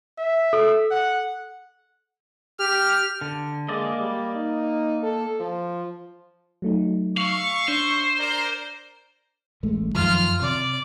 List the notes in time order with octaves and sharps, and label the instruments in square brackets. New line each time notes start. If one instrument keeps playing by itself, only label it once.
[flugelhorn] E5
[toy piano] A4
[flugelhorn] F#5
[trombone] G4 [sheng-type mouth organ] F6
[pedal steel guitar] D3
[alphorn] G#3 [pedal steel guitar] A#3 D5 D#5
[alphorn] G3
D#4
A4
F3
[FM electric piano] F#3 A3 D#4
[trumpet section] E5 C#6 [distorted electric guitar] F5
[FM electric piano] D4 [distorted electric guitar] C5
[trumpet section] A#4 D5 A#5
[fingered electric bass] A1 G#3 A3
[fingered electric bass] F#2 D#3 F3 [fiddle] F4 F6
[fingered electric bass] C3 [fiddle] D5